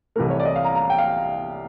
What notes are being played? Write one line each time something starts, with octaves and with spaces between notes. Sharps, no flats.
C2 C3 E3 A3 A#4
C#5
D5
D#5
F5
A#5
A#5
G5
F5